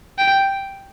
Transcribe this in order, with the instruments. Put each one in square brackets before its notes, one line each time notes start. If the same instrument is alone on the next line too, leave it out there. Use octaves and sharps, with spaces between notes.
[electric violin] G5